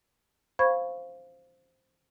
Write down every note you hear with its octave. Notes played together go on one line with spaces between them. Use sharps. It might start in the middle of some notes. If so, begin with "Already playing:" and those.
C5 F5 B5 C#6 G#6